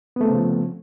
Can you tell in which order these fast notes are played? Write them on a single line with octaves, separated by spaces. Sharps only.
B3 A3 C4 C#3 F3